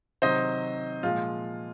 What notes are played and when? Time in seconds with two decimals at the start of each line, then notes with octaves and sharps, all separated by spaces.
0.22 C3 D#3 F#3 C5 D#5
1.03 A#2 F3 G#3 F4